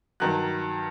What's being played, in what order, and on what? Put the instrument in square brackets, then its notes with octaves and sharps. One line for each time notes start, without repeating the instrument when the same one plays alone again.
[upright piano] G2 D#3 F#3 F#6